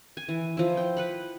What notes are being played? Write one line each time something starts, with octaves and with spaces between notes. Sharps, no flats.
G#5
E3
F3 E4
G5
B4 F#5 B5